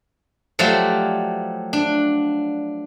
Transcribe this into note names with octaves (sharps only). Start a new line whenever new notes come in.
F3 F#3 A3 G4 C5 D5
D4